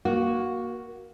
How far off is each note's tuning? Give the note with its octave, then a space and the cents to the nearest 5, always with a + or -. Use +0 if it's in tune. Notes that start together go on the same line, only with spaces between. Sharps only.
A#3 +15 F#4 +0